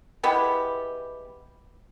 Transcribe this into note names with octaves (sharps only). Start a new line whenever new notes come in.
G#3 B3 E4 G4